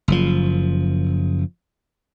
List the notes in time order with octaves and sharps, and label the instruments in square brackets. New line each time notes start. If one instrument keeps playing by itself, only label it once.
[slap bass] F#1 F3